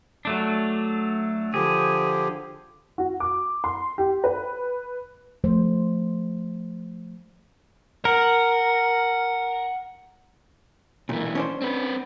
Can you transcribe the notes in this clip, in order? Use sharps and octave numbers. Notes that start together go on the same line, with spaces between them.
F#3 A3 D4
D3 F3 G4 G#4
F#4
D6
C6
G4
B4
F3 A3 C5
A#4 F#5
B1 A#2 E3
C#4 D4 C5
C4 B4